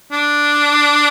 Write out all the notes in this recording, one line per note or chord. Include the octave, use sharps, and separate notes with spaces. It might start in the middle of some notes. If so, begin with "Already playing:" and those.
D4